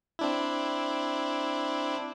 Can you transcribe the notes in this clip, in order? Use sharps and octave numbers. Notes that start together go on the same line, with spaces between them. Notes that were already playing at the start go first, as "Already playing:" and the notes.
C4 D4 E4